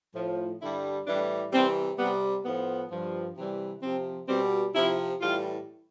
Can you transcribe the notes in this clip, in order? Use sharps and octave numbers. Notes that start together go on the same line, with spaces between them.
A2 F3
G2 D3 G3 E4
A2 E3 G3 D4
C3 E3 G3 C4
C3 G3 B3
A2 F3 B3
G2 F3
C3 E3 G3
C3 F3 C4
B2 G3 C4
C3 F3 E4
A2 E3 G3 F4